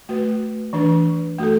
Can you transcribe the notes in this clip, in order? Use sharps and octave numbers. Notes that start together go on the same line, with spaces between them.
A3 F#4 B4
E3 D4 B4
A3 F#4 A4